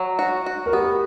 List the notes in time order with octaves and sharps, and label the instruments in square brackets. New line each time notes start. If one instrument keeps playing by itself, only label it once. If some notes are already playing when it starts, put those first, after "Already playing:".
Already playing: [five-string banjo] F#3
F#4
F#4
[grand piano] A#4
[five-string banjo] B3 [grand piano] G4